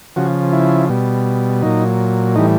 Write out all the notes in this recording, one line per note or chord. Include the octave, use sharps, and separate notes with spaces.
C#3 F3 F#4
E4
B2 G3
A#2 F#3 D#4
A2 E3 G3 D#4